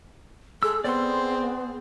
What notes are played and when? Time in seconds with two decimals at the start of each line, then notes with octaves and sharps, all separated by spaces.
0.63 G#3 G#4 A4 E6
0.84 B3 C4 D5 C6